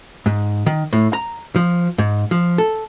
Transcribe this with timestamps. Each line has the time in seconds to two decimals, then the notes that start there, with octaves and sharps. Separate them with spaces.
0.26 G#2
0.66 D#3
0.93 A2
1.13 A#5
1.56 F3
1.98 G#2
2.31 F3
2.58 A4